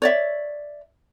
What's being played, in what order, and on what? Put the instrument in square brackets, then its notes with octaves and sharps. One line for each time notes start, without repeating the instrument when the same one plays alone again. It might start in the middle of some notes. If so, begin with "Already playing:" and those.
[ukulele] C#5 D5 E5